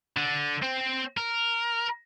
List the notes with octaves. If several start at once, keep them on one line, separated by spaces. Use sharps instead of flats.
D3
C4
A#4